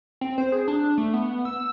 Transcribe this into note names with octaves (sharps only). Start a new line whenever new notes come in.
C4
C5
G#4
D4
A3
B3
E6